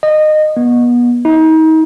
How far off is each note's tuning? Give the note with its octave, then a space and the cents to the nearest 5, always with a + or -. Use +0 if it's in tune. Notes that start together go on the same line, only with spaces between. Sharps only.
D#5 -20
B3 -30
D#4 +35